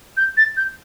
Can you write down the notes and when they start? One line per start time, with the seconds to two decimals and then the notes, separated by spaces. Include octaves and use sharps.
0.17 G6
0.37 A6
0.57 G6